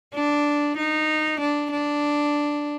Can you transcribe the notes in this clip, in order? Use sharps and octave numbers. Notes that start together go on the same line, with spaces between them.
D4
D#4
D4
D4